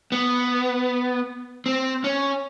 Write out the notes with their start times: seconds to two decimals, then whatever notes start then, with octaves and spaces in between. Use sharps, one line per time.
0.12 B3
1.66 C4
2.04 C#4